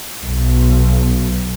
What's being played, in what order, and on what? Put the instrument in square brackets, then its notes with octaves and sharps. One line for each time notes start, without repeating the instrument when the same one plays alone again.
[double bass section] B1